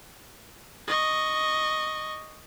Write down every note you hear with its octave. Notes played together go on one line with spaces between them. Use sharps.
D#5 C#6